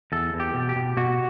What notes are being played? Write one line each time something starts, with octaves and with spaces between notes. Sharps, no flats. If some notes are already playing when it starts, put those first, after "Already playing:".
E2 A4
E2
G4
B2
G4
B2
B2 F#4